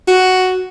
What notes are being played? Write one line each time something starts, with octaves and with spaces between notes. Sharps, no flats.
F#4